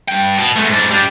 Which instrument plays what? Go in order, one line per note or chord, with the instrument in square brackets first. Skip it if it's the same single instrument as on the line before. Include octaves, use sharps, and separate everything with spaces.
[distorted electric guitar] G2 G5
B2 B3
G#3 A3
G#2 D4
G3 D4